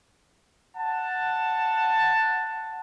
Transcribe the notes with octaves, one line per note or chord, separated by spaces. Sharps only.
F#5 A5